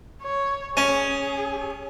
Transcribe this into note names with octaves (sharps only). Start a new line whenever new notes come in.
C#5
C#4 G#4